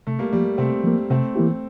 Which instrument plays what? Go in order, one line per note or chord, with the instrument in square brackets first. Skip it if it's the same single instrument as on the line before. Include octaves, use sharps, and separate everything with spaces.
[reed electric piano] C3 [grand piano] A3
[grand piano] G3 A#3
[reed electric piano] F3 A#3 [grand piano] G3
[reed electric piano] C3 [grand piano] A3 C4
[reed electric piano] F3 A#3
[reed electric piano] C3 [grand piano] A3 C4
[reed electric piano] E3 A#3 E4 G4